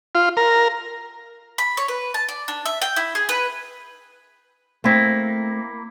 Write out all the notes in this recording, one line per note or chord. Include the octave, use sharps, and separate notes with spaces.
F4
A#4
B5
C#5
B4
A5
D5
D4
E5
G5
E4
G#4
B4
A3 A#3 C4 E4